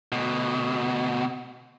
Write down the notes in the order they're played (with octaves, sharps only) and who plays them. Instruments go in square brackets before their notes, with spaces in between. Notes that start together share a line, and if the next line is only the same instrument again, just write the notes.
[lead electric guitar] D2 B2